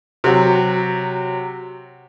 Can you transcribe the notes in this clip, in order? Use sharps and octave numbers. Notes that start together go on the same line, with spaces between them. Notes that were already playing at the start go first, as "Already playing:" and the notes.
C3 F#3